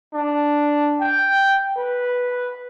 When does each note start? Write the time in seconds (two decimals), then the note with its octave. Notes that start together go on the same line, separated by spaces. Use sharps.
0.14 D4
1.00 G5
1.76 B4